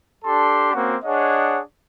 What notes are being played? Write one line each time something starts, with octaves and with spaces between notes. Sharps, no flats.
D4 G4 A4 A5 C6
A#3 C4 C#4 F#4
D4 G#4 C#5 D#5 F#5